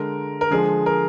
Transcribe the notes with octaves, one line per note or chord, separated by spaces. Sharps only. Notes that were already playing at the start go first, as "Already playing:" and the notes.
Already playing: D3 G#3 A#4
A#4
D3 F3 G#3 G#4
A#4